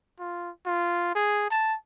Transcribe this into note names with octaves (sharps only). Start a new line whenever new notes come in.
F4
F4
G#4
A5